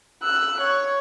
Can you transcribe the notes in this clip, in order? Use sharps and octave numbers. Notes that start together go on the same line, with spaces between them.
E6 F#6
C#5